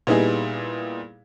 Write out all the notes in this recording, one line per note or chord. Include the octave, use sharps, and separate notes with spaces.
A#2 G3 B3 D#4 E4 G#4